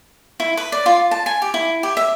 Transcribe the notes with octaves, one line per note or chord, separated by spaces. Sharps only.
E4
B4
D5
F4
A5
G#5
G4
E4
G4
E5